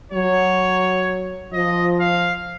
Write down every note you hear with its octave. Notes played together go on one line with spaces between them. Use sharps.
F#3 C#5
F3 D#5
F5